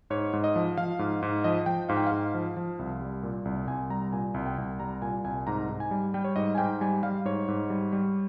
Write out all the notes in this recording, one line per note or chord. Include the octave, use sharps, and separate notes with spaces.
G#2 C#5
G#2
D#5
F3
F3 F5
G#2
G#2
F3 D#5
F3 G5
G#2 F5
G5
G#2 F5
F3
F3
C2
G3
A#2
C2
C2 G#5
G3 A#5
A#2 G#5
C2
G5
C2
G3 A#5
A#2 G#5
C2 G#5
G#2 A#5
G#2
G#5
G3
G3 G5
C#5
G#2 D#5
G#5
G#2 G5
G3 G#5
G3 F5
G#2 C#5
G#2
G3
G3